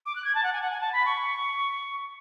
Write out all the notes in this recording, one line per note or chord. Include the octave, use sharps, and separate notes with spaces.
D6
F#6
G#6
A5
F#5
G#5
F#5
G#5
A5
B5
C#6